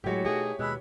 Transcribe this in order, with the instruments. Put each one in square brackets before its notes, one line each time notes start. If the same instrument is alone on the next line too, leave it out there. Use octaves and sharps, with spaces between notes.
[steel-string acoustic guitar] A2 F#3 G#3 [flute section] F#4 [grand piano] G4 C#5
[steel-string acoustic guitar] B2 A3 D#4 [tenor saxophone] G#4
[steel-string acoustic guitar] D#2 B2 [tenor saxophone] G#3 [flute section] B5 E6 F#6